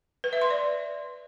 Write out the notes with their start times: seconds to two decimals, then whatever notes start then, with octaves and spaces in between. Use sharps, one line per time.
0.24 B4
0.33 E5
0.41 C6
0.50 D5